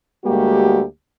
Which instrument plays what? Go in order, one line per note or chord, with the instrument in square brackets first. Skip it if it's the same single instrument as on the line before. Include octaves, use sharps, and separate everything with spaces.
[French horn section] D2 G3 G#3 A#3 F#4 G4